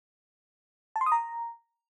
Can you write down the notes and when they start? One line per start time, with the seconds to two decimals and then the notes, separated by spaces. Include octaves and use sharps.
0.96 A5
1.01 C6
1.06 D#6
1.12 A#5